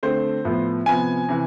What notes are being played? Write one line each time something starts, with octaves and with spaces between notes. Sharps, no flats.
D3 A3 C4 C5
A2 F3 B3
C3 F3 B3 G#5
C3 E3